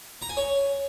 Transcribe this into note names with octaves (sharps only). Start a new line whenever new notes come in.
A#5
G#5
C#5